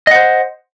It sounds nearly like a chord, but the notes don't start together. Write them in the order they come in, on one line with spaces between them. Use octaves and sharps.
D#5 F#5 C5